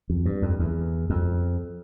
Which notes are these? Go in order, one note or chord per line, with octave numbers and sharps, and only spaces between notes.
F2
G2
F2
E2
F2